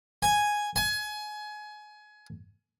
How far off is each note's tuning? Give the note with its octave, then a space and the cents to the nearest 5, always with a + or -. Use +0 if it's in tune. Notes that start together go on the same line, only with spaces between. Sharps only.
G#5 +0
G#5 +25